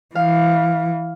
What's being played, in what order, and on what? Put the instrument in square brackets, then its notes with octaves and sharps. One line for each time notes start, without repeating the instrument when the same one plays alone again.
[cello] E3 [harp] F5